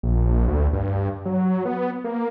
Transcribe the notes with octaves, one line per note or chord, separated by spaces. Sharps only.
A#1
D2
G2
F#3
B3
A#3